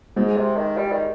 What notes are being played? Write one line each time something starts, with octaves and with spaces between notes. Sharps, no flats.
G#2 G#3
C3
D#3
G3
D#3